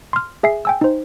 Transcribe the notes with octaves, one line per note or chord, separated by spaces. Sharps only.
C6 F6
G#4 E5 G#5 C7
G5 G#5 E6
D#4 C5